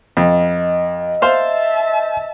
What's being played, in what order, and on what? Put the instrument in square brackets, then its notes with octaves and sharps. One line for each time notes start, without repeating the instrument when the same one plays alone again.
[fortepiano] F2 [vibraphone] D#5
[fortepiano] C5 F5 [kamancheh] E5 A5